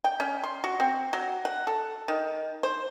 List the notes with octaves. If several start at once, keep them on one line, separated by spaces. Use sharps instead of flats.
G5
C#4
C6
F#4
C4
F#3
F#5
A4
D#3
C5